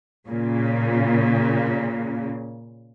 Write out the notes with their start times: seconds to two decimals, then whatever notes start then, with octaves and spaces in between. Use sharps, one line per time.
0.29 A#2 C#3